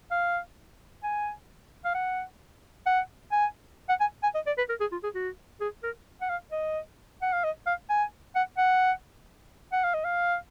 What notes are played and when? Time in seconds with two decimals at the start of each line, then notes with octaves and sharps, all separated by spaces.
0.11 F5
1.03 G#5
1.85 F5
1.94 F#5
2.86 F#5
3.32 G#5
3.89 F#5
4.00 G#5
4.23 G#5
4.35 D#5
4.47 D5
4.58 B4
4.69 A#4
4.80 G#4
4.92 F4
5.03 G#4
5.15 F#4
5.61 G#4
5.83 A#4
6.21 F#5
6.29 F5
6.52 D#5
7.22 F#5
7.33 F5
7.44 D#5
7.67 F5
7.90 G#5
8.35 F#5
8.57 F#5
9.72 F#5
9.84 F5
9.94 D#5
10.05 F5